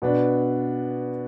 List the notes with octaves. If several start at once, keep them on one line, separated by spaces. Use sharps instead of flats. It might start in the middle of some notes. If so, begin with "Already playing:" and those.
B2 B3 D4